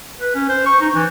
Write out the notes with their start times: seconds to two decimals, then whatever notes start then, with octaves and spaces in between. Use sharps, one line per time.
0.20 B4
0.35 C#4
0.49 C5
0.66 C#6
0.81 D#4
0.94 E3